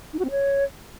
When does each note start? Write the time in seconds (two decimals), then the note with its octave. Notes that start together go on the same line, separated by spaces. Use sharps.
0.13 D#4
0.19 F#4
0.25 C4
0.31 C#5